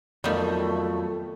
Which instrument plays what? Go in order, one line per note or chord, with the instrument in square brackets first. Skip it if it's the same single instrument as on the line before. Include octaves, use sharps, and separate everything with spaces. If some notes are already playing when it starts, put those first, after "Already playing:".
[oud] F2 [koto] D#3 G3 [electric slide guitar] F#3 B3 F#4 [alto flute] A3